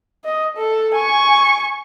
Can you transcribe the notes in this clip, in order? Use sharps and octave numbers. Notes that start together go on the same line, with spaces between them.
D#5
A4
G#5 C#6